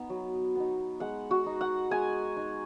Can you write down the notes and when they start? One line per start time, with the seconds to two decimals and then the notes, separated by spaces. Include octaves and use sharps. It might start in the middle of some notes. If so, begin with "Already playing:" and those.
Already playing: B3 D#4
0.10 F#3
0.55 B3 D#4
1.00 G#3 F#5
1.31 F#4
1.46 D#4
1.61 F#5
1.91 G#3 G#5
2.37 D#4